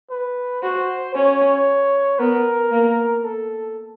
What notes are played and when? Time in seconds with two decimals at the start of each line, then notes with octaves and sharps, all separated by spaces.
0.10 B4
0.62 F#4 C5
1.15 C#4 C#5
2.19 B3 A#4
2.72 A#3
3.24 A4